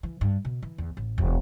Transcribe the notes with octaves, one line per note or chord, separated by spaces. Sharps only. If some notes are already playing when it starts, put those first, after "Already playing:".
E3
G2
B2
E3
E2
A1
E1